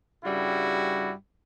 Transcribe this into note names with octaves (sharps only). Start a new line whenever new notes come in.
G2 C#3 G3 E4 F#4